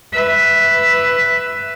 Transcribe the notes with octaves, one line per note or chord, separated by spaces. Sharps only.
B4 E5